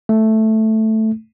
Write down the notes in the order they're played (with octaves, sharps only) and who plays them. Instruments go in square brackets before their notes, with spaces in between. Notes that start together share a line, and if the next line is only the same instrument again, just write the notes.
[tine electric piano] A3